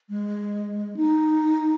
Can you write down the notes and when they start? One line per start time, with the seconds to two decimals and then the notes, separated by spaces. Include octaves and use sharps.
0.10 G#3
0.97 D#4